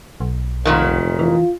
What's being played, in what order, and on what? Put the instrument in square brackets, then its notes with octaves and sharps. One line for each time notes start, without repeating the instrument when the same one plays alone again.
[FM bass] B1
[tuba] F1 [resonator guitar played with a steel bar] F#2 A#2 D#3
[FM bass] E3 [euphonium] F4